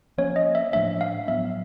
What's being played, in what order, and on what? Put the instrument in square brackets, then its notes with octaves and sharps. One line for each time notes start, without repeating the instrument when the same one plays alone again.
[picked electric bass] F3 A#3 C#4 [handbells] C#5
[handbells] D#5
E5
[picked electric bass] A2 F3 A3 D4 [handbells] E5
[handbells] F5
[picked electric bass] A2 F#3 B3 [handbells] E5